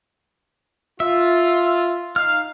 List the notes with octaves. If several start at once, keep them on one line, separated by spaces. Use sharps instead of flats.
F4 E5
D#4 F5 F6